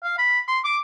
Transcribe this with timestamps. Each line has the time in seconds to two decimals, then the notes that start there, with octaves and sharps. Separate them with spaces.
0.03 F5
0.18 B5
0.48 C6
0.64 D6